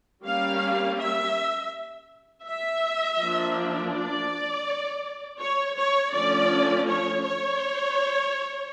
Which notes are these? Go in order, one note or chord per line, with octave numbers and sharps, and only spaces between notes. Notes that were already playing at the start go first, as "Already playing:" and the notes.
G3 A#3 C#4 F5
E5
E5
F3 A#3 D4
D5
C#5
C#5
D3 F3 A3 C#4 D5
C#5
C#5